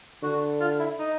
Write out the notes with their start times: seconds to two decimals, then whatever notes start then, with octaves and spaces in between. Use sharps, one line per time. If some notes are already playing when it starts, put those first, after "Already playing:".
0.23 D3 F#4
0.60 F4
0.79 E4
0.99 D#4